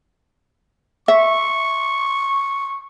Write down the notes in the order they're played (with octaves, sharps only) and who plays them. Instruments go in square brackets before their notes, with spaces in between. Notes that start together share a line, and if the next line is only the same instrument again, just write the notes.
[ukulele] E5 [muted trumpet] C#6